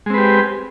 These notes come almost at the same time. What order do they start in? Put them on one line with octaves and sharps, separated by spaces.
G#3 C4 B4 G4